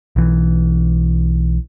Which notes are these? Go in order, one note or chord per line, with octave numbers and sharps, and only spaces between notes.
B1 E3